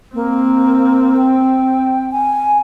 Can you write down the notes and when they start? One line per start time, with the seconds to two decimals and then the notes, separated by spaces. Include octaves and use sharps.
0.14 A#3 C4
1.17 G5
2.12 G#5